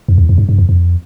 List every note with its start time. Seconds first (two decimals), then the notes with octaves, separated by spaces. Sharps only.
0.08 F2
0.18 E2
0.29 F2
0.38 G2
0.49 G2
0.58 F2
0.69 F2